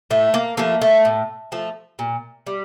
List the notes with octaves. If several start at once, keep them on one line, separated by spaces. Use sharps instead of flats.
A2 A3
A#3
F3 A3 A#3
A3
A2
F3 A3
A#2
G3